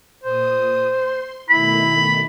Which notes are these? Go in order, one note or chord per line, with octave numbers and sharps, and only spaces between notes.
A#2 C5 D#6
C6
B2 D#3 A3 E4 B5